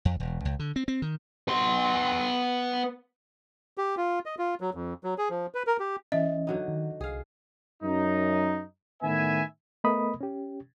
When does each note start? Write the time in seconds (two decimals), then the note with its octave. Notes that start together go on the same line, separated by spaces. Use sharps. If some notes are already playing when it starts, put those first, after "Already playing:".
0.05 F2
0.20 E1
0.45 C#2
0.59 D3
0.76 C4
0.88 C4
1.02 D#3
1.48 B3 C6
3.78 G4
3.97 F4
4.26 D#5
4.39 F4
4.61 F#3
4.74 F2
5.04 F#3
5.18 G#4
5.30 F3
5.55 B4
5.67 A#4
5.80 G4
6.12 E3 C#4 D#5 E5
6.47 D3 F#3 D#4
6.68 D#3
7.01 C2 G#4 F5
7.83 F#2 D#4
9.03 A2 D#3 B3 B4 E5 G#5
9.84 A3 B3 A#4 D#5 B5 D#6
10.21 C#4 G4